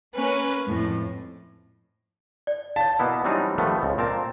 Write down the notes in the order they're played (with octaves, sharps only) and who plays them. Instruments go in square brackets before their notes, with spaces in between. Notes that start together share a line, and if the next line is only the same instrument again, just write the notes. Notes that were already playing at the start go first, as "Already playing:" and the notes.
[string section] A#3 C#4 B4
F2 A2
[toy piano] D5
[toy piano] C#5 F5 [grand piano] A5
[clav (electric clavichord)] B2 A#3 B3 E4
E3 F#3 G3 C4 D4 D#4
D#3 F3 G3 A3 B3
C#2
A#2 C4 A#4 A5